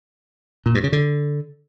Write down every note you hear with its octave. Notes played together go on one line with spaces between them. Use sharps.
A#2
G2
C#3
D3